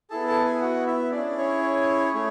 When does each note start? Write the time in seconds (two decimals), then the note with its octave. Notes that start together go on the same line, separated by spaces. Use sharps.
0.10 B3 E4 G#4 A4 A5
0.27 A4 A5
0.44 G#4 G#5
0.61 F#4 F#5
0.86 E4 E5
1.12 C#4 D4 E4 G#4 D5
1.38 C#4 C#5
2.14 A3 E4 G#4